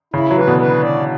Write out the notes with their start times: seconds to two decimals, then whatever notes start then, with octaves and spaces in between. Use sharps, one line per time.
0.14 C#3 E4
0.31 F#3
0.36 E3 B4
0.47 B2 D3
0.59 B4
0.82 D5